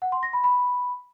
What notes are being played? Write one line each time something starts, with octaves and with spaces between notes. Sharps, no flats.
F#5
C6
A#6
B5
B5